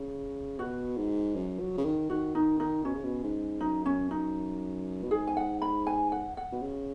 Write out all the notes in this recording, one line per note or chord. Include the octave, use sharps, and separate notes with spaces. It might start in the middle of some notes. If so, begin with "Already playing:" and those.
Already playing: C#3
B2 F#4
G#2
F#2
F#3
C#3
D#3
D#3 F#4
D#3 D#4
D#3 D#4
B2 C#4
C#3
B2
G#2
F#2 D#4
C#4
D#4
B2
G#2 G#4
G#5
F#5
B5
G#5
F#5
F#5
B2
C#3